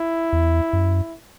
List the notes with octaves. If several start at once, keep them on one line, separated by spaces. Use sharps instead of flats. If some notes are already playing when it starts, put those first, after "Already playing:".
Already playing: E4
E2
F#2